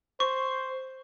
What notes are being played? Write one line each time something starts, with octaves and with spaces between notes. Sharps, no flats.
C5 C#6